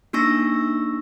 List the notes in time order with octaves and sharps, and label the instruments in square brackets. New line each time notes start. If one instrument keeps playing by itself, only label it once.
[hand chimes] A#3 D4 D#4 C#6 E6 A#6